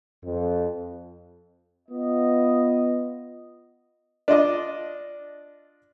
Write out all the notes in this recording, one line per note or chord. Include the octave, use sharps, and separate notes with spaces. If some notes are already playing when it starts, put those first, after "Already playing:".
F2
B3 F4 D#5
D4 F4 D#5 D6